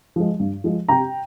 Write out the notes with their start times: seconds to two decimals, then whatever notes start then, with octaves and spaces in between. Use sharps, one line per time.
0.16 F3 G#3
0.40 G2
0.64 F3 G#3
0.88 C3 G5 A#5